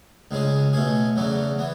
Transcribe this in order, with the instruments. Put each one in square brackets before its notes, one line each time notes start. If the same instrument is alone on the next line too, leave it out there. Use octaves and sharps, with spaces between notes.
[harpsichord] C#2 C#3 G#3 C#4 G#4
B2 A3 C#4 G#4
E2 C#3 F#3 A3 C#4
E3 B3